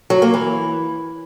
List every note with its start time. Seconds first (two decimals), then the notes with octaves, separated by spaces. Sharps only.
0.10 F#3
0.22 A#3
0.34 E3